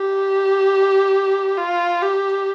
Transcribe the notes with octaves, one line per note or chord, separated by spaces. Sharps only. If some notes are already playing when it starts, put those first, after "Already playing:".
Already playing: G4
F4
G4